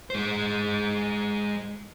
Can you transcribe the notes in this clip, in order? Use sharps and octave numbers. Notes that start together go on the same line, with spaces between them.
G#3 C5